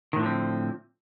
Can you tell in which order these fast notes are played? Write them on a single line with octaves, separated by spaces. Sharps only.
D#3 A2 D3 F3 C4